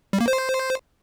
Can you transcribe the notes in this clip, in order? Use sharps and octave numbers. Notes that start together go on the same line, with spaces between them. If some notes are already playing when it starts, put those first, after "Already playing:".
G3
A#3
C5